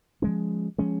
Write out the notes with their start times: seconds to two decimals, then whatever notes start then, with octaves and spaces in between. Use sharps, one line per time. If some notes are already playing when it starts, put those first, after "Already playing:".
0.22 F3 G#3 C#4
0.78 F3 G#3 C#4